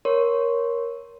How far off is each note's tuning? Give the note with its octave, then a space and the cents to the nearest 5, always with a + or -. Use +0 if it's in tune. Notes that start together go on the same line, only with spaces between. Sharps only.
A#4 +15 C#5 +0 C6 +0